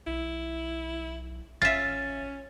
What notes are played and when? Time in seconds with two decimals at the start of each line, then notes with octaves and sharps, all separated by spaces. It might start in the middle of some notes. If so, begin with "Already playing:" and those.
0.07 B1 E4
1.62 A1 C#4 F4 E5 A6